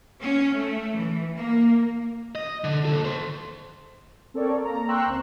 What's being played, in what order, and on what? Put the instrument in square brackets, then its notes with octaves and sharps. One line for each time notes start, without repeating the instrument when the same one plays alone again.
[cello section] C#4
A3
E3
A#3
[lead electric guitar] D#5
D3
D#2 A4
A4 C5
[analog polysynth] C4 A4 A#4 C#5 D5
A#3 A#5
G5 A#5 C6 C#6 E6 F#6
C#2 C4